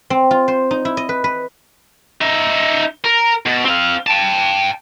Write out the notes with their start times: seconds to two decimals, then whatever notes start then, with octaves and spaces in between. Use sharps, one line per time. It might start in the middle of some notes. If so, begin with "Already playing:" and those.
0.10 C4
0.31 F4
0.48 C5
0.71 D#4
0.85 E4
0.97 D#5
1.09 B4
1.24 B4
2.21 D#4 E5
3.04 A#4
3.46 B2
3.64 C4 F5
4.07 G5 A5